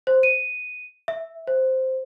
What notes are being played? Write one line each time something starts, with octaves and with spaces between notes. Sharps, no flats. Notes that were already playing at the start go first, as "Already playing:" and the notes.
C5
D#7
E5
C5